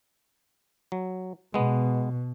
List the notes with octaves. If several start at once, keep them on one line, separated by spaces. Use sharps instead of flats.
F#3
B2 G#3 B3